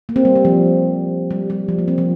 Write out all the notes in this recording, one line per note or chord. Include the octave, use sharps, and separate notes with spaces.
A#3
C4
G3
G3
F3
G3
G3
F3
A#3
C4
F3